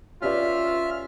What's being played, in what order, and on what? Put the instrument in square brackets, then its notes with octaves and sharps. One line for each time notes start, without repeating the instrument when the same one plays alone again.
[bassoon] C#4 [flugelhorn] F4 [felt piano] G4 B4 D5 [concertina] E5 F6